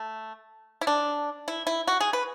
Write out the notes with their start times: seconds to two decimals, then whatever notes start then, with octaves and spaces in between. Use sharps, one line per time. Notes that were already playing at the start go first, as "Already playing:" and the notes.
Already playing: A3
0.81 E4
0.87 D4
1.48 E4
1.67 E4
1.87 F#4
2.00 G#4
2.13 B4